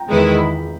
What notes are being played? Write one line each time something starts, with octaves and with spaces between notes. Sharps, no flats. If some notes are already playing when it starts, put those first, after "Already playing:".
Already playing: G5 A#5
E2 D#3 G#3 B3 E4
B5